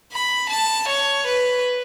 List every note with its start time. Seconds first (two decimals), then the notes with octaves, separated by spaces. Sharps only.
0.12 B5
0.50 A5
0.89 C#5
1.27 B4